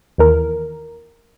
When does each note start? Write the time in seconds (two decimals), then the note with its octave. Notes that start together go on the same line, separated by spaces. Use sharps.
0.18 D#2 E3 A#4